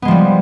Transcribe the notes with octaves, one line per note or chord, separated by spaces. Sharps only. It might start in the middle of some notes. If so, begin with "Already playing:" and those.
F3 G3 G#3 B3